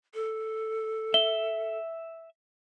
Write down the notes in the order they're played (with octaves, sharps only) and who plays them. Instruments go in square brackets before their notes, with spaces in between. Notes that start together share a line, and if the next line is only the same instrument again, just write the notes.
[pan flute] A4
[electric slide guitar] E5 [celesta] G7